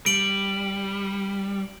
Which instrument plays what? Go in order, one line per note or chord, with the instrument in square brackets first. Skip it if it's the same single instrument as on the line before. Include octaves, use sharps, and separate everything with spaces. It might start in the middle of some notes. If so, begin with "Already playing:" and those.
[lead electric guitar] G3 [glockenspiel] D7 F#7